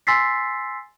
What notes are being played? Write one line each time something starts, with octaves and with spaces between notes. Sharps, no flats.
G#5 C6 E6 A6 B6 C7